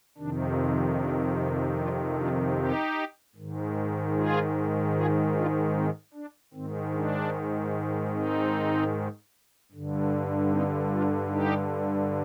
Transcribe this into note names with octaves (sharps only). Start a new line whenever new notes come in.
F2 C3 D#3 D4
C4
D4
C4 D#4
D4 F4
D4 F4
D#4 G4
G#2 D#3
F4 G#4
F4 G#4
D4 F4
C4 D#4
D4
G#2 D#3 C4
D4
C4 D#4
G2 D3
C4 D#4
D4 F4
D#4 G4